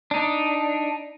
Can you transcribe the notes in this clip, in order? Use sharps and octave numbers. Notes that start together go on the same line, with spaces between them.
D4 D#4